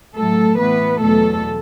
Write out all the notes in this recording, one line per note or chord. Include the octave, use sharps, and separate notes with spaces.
A2 F#3 A3 A4
A2 E3 B3 B4
E2 B2 F#3 A3 A4